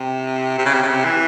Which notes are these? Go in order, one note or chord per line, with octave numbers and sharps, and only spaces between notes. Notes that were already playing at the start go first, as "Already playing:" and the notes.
Already playing: C3
C3
C#3
C3
C#3
C3
E3